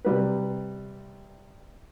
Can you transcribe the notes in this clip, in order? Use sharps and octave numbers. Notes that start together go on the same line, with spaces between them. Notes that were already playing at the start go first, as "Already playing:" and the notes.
C3 G3 B4